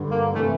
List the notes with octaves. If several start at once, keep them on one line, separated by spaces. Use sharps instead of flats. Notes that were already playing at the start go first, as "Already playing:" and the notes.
Already playing: G2 D3
A#3
C3 E3 A3